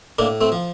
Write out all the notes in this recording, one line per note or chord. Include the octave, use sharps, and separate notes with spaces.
A2 A#3 D4
A3 C4
F3